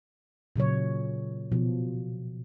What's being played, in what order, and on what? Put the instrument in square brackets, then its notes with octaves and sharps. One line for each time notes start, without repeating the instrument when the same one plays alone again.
[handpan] A#2 C#3 F#3 C#5
B2 F3